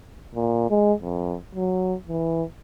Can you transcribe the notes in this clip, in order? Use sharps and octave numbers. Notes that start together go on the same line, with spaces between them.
A#2
G#3
F2
F#3
E3